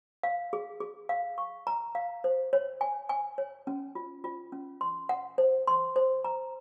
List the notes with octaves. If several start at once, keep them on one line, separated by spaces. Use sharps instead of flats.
F5
G#4
G#4
F5
C#6
A#5
F5
C5
C#5
G#5
G#5
C#5
C#4
F4
F4
C#4
C6
F#5
C5
C6
C5
A#5